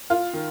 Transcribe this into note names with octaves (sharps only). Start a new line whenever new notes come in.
F4
D#3